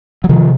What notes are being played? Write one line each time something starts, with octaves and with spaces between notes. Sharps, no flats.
F#3
C3 D#3 F3